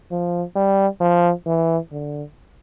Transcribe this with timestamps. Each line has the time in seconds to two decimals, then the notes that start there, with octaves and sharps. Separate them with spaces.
0.11 F3
0.56 G3
1.01 F3
1.46 E3
1.91 D3